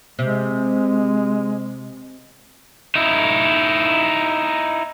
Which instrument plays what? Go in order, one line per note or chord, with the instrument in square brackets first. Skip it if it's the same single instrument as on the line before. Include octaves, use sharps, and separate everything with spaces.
[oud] C3 [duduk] G#3
[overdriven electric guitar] D#4 E4